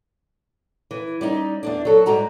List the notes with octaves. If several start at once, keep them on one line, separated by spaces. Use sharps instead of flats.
E3
G3 C#4 D#4
E2 G2 D4
F#3 A4
G#2 G3 F#4 A#5